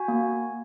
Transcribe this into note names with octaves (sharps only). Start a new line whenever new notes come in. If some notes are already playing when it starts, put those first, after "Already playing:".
Already playing: F#4 G#5
A#3